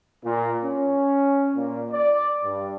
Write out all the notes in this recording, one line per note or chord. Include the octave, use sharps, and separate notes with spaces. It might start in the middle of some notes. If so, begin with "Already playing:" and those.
A#2
C#4
A#2
D5
G2